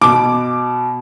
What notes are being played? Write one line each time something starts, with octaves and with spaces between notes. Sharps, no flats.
B2 D6